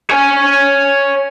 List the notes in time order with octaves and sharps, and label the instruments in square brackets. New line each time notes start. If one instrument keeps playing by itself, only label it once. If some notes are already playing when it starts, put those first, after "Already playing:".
[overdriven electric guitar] C#5 G#5